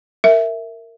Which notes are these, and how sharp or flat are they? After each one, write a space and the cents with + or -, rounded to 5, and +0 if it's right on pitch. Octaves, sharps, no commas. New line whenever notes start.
A#4 -20 E5 +0